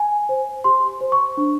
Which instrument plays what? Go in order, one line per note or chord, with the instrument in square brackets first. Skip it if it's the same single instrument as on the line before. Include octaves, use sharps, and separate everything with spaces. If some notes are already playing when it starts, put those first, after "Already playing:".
Already playing: [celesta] G#5
C5
G4 C6
C5
C#6
D4